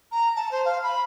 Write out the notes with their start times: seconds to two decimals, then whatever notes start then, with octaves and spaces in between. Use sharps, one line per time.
0.12 A#5
0.36 A5
0.51 C5
0.65 F5
0.83 B5